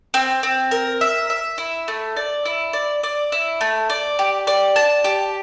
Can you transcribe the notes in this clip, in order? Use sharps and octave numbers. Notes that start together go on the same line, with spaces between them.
C4
C4
A#4
E5
E5
E4
A3
D5
E4
D5
D5
E4
A3
D5
G4
D5
A5
G4